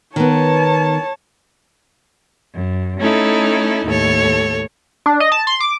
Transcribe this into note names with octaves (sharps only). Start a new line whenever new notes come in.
D#3 B3 C#5 A5
F#2
A3 C#4 D#4 E4 A4
D#2 A2 A4 C#5
D4
D#5
A5
C6
D6